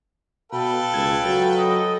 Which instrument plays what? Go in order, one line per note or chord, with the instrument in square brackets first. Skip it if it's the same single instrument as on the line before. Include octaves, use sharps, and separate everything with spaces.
[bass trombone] B2 [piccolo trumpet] A4 [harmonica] B4 F5 G5
[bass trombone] C#2 [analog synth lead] G#6
[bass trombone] F#3 [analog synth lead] A4
[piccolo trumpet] D#5